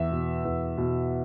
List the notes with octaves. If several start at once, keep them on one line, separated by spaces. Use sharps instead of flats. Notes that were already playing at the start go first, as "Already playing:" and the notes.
Already playing: E2 E5
B2
E2
B2